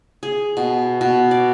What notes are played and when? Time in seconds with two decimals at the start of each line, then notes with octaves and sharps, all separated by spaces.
0.23 G#4
0.57 B2
1.01 B2
1.31 D5